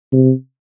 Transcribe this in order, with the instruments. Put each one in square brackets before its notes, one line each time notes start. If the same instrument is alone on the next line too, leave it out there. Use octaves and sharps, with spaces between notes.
[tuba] C3